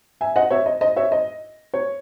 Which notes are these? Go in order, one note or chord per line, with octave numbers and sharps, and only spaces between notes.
E5 G#5
D#5 F#5
C#5 E5
D#5
D#5
C#5 E5
D#5
C#5